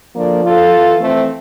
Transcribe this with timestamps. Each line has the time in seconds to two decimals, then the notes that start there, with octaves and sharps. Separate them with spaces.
0.16 D2 D3 F3 A#3 D4
0.45 F4 A4
0.73 F2 E3
1.01 A3 C4